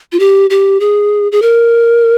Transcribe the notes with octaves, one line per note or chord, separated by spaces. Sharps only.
F4
G4
G4
G#4
G#4
A#4